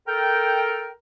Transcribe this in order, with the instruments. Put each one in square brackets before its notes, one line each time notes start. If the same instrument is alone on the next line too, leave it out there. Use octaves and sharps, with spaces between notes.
[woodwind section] A4 A#4 G5